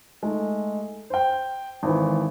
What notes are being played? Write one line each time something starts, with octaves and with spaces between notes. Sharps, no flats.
G#3 A3 D#4
C5 G5
G#1 E3